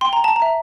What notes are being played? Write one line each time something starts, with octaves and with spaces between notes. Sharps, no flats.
G5 C6
A#5
A5
A#5
E5